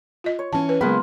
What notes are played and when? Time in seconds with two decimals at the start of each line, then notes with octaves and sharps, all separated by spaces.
0.24 F4 D#5
0.39 C#5
0.53 E3 C#4 A5
0.69 B4
0.81 C#3 F#3 G#3 A#3 B3 F4 A#4 B4